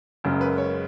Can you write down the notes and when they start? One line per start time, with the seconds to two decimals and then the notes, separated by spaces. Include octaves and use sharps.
0.24 F#1 F#2 C#3 G#3 A#4
0.41 B4
0.58 C#5